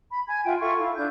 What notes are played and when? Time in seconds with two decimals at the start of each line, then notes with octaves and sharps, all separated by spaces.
0.12 B5
0.28 G#5 G#6
0.46 F4 E5 F#5 G5
0.60 F4 A4 E5 C#6
0.79 E4 F5
0.96 D4 A4 G6